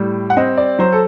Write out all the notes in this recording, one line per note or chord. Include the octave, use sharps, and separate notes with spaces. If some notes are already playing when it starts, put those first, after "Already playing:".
Already playing: A2 G3
F#5
C4 D#5
D5
F#3 C5
A4